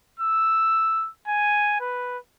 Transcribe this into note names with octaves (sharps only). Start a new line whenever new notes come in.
E6
G#5
B4